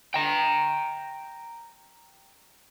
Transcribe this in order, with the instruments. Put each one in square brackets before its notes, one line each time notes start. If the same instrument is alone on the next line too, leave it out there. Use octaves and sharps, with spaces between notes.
[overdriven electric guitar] G5 A#5